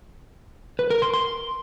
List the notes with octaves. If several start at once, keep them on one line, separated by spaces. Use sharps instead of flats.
B4
A#4
C6
C6